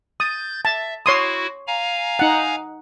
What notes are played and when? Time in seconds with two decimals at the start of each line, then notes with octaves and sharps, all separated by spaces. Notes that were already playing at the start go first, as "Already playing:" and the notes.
0.20 D#6 G6 A6
0.65 E5 A5
1.06 E4 F#4 C#5 C6 D#6
1.67 F5 G#5 A#5
2.19 D#4 F#5